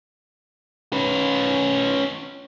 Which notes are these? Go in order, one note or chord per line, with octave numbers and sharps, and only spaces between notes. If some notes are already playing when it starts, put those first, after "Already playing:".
C#4 B4